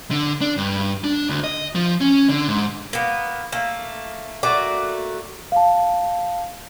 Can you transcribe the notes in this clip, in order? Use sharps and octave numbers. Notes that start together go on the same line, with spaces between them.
D3
D4
G2
D4
D2
D#5
F3
C#4
D3
G#2
A#3 B3
A3 A#3
A3 A#3 F#4 D5
F5 A5